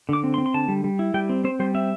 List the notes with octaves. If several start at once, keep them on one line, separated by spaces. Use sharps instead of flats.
D3 D6
C4
C6
C4
C6
D3 A5
G3
G3
E4
G3 G5
C4
C4 C5
G3 C5
C4 E5